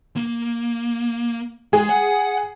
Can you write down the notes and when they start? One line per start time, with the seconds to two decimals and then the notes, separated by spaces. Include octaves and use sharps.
0.16 A#3
1.73 G#3 G#4
1.89 F#5